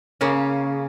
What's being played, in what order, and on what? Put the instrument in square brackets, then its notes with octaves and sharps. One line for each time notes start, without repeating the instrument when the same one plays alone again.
[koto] C#3 A#3 C#4